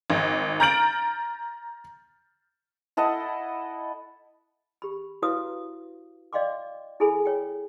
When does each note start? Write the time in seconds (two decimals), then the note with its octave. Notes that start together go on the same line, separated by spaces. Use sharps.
0.10 G#1 D#5
0.60 A#5 F6 G6 A6 D7 F#7
2.97 E4 A4 D#5 F#5
4.82 G4 B5
5.22 E4 F#4 B4 C#5 F5 D#6
6.33 D5 D#5 F5 G5 C6 D6
7.00 E4 G#4 A4 G#5 B5
7.25 C#5 G5